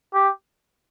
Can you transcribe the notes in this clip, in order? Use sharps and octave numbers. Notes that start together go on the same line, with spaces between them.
G4